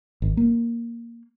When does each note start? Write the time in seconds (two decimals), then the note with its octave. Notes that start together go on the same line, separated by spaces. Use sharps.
0.22 G#1
0.37 A#3